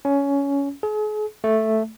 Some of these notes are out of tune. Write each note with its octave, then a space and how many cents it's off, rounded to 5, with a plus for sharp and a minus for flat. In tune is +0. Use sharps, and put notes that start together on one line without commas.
C#4 +15
G#4 +40
A3 +0